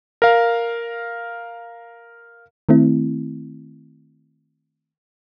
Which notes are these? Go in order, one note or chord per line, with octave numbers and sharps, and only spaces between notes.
A#4 F5
D#3 A3 C4 E4